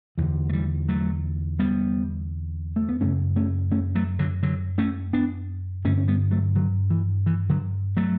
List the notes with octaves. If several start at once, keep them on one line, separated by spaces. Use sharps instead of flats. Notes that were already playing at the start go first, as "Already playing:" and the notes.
E2 D3 E3
A3
E3 G3
F#3 A3
G3 B3
A3
B3
F#2 C#3 A3 C#4
A3 C#4
A3 C#4
F#3 A3
D3 F#3
D3 F#3
A3 C#4
B3 D4
G2 D3 A3 C#4
C#4
G3 B3
F#3 A3
D3 F#3
E3
E3
D3 F#3
F#3 A3